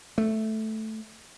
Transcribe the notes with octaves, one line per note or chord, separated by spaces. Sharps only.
A3